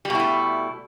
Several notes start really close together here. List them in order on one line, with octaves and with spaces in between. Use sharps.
G3 B2 E4 A3